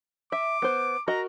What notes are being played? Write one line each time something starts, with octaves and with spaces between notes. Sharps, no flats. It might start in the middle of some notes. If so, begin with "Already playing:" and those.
E5 D6
B3 C5
F#4 A#4 D#5 A#5